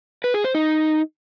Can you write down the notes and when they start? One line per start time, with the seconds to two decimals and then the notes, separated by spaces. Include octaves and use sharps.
0.24 B4
0.34 G#4
0.44 C5
0.55 D#4